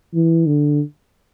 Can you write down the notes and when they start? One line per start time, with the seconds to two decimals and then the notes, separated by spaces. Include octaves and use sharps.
0.14 E3
0.46 D3